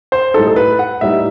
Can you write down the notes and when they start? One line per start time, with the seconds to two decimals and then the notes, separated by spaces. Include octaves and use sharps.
0.12 C5
0.34 A2 G3 D#4 A4
0.47 A4
0.56 B4
0.79 F#5
1.01 A2 G3 D#4 E5